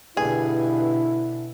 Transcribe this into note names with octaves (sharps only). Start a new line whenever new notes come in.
G2 B2 D3 E4 G#4